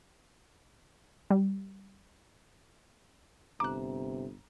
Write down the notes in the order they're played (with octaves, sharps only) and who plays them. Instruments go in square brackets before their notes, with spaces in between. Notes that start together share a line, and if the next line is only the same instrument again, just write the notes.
[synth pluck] G3
[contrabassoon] G1 [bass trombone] C3 [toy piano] A#5 [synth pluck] D6 F#6